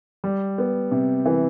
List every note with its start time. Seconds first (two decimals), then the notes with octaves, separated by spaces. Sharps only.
0.24 G3
0.58 B3
0.91 C3
1.26 E3